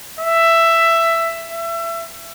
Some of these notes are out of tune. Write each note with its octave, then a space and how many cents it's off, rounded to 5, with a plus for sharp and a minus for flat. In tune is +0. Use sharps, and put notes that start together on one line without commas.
E5 +10
E5 +30